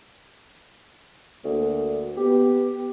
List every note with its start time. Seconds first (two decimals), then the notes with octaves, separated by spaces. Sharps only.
1.44 D2 A#3
2.17 B3 G4